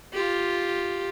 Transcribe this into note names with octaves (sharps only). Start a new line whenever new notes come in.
F4 G4